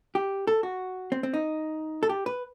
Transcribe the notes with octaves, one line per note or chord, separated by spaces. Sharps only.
G4
A4
F#4
C4
C4
D#4
A4
G4
B4